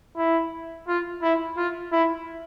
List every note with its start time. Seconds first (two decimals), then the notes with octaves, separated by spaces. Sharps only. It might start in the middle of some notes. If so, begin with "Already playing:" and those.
0.17 E4
0.88 F4
1.23 E4
1.57 F4
1.92 E4